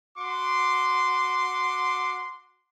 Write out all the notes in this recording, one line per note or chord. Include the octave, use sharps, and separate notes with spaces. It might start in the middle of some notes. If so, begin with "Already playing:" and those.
F#4 C6 D6